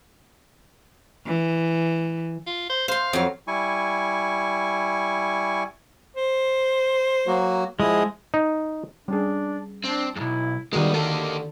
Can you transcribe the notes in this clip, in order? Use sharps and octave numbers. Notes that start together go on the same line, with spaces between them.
E3
F4
C5
C5 F5 C6
F2 F#3
G3 E4 G#5 C#6
C5
F#3 A#3 F#4
F3 G#3 E4 D#6
D#4
G3 C#4 D4 G#4
C4 D4
B1 E2 E4
D#3 G3 G#3 B3 F#4 A#4
D3 A#3 G4 A4